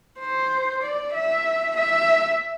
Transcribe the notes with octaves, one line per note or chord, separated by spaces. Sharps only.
C5
D5
E5
E5